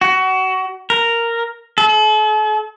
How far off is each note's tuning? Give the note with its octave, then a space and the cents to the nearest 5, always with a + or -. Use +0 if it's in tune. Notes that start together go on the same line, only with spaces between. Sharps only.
F#4 +25
A#4 -5
A4 -45